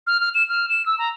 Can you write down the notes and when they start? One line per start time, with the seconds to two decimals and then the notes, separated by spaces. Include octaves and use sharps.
0.07 F6
0.20 F6
0.35 E7
0.49 F6
0.69 E7
0.86 E6
0.98 A#5